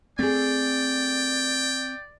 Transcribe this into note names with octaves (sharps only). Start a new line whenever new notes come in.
A3 C4 G#4 D5 G5